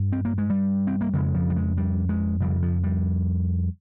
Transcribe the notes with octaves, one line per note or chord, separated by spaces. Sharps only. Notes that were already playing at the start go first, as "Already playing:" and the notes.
Already playing: G2
C4
A#3
G#3
G3
C4
A#3
F2 C#3 G#3
F3
G3
G#3
G3
G#3
F2 C#3 G3
F3
G3